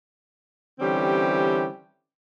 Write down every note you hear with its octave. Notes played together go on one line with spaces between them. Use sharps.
D3 E3 G3 C4 C#4 G4